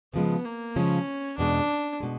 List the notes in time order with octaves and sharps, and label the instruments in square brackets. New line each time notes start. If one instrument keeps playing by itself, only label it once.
[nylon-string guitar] C#3 F3 G#3 [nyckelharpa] B3
[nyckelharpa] A#3
[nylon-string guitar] C#3 F3 G#3 [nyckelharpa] C#4
[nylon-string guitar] E2 B2 G#3 [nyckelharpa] D4
[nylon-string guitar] B2 G#3